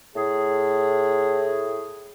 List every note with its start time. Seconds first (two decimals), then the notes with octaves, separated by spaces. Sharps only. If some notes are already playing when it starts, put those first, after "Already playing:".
0.15 A2 G#4